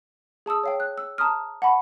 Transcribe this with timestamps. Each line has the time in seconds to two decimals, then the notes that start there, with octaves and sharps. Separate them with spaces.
0.46 G#4 A5 D#6 E6
0.63 C#5 F5 G5
0.80 F#6
0.98 E6
1.18 A5 A#5 C6 D#6 F6
1.62 F#5 A5 B5 C#6